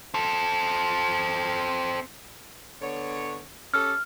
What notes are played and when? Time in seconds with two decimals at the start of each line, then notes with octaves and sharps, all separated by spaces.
0.14 C4 A4
2.82 D3 B3 C#5
3.74 C#4 G4 A4 F6